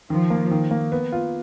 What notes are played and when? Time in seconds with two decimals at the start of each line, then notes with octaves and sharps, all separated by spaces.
0.10 D#3 F3
0.30 A#3
0.51 D#3
0.71 A#3
0.92 B3
1.12 F4